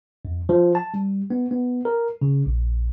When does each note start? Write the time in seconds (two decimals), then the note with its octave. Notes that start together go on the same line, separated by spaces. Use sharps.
0.25 F2
0.49 F3
0.75 A5
0.94 G3
1.30 B3
1.51 B3
1.85 A#4
2.22 C#3
2.46 A#1